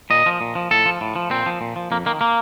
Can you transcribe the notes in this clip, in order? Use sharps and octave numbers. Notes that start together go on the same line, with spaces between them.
A#2 D#5
F3
A#2
F3
A2 A4
F3
A2
F3
A#2 C4
F3
A#2
F3
F2 A#3
D#3 A#3
A#3